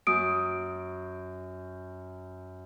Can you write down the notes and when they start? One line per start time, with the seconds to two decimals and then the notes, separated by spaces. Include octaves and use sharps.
0.07 F#2 D#6 D7